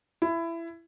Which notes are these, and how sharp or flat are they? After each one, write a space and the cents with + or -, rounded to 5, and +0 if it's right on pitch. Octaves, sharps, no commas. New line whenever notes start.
E4 +20